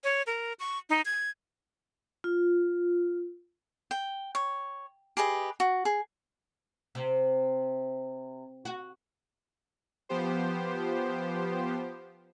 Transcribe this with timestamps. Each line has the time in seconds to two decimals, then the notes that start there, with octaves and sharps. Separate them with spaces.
0.04 C#5
0.27 A#4
0.59 C#6
0.90 D#4
1.05 G#6
2.24 F4
3.91 G5
4.35 C#5
5.17 G4 G#4 B4 D#5
5.60 F#4
5.85 G#4
6.95 C3
8.65 F#4
10.09 F3 B3 G4 C5